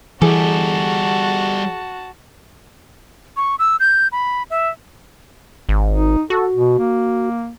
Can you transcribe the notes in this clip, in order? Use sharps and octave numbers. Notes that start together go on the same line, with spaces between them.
E3 G3 F#4 G#4 A4 G#5 A5 D6
C#6
E6
G6
B5
E5
G#1
D#4
F#4 A4
B2
A#3